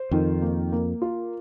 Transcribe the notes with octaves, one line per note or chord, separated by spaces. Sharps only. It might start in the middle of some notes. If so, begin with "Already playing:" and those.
Already playing: C5
F2 D#3
A#3
A#3
F4